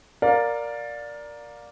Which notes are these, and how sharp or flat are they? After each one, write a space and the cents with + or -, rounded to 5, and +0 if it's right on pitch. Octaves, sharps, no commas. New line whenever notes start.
A#4 +0 D5 +0 F5 +25